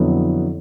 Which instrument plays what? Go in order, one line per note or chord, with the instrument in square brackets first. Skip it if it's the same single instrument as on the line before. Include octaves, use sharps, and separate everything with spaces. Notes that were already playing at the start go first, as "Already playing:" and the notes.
Already playing: [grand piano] F2 D3 F#3 B3 E4